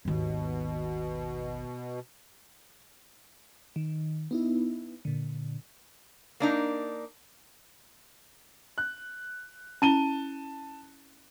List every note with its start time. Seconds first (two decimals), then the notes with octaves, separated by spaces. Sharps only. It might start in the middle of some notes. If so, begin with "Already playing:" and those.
0.05 G#1 D#2 B2
3.76 D#3
4.31 B3 D#4 E4
5.05 A#2 D3
6.40 A#3 D4 D#4
8.78 F#6
9.82 C#4 E4 A5 D#7 G7